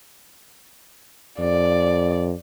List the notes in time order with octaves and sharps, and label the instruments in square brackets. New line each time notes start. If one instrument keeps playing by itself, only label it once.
[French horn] F2 [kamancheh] D5